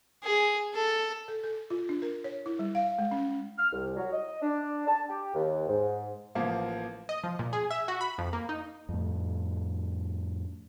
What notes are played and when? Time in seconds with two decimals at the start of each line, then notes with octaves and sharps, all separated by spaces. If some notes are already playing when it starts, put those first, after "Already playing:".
0.24 G#4
0.74 A4
1.28 A4
1.43 A4
1.70 F4
1.89 D4
2.02 A#4
2.24 C#5
2.46 E4
2.59 G3
2.75 F5
2.98 G#3
3.11 C#4
3.59 F6
3.73 C2
3.97 F#3
4.12 D#5
4.42 D4
4.88 A5
5.09 G4
5.35 D#2
5.68 G#2
6.35 A1 F3 A#3 F5
7.09 D#5
7.24 F3
7.39 A#2
7.53 G#4
7.71 E5
7.88 F#4
8.01 B5
8.18 F2
8.33 A#3
8.49 D#4
8.89 F2 A2